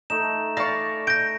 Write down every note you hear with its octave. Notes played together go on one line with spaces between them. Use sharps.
A3 D#4 E7
D5 F5 B5 C#6 A#6
G6 A#6 D7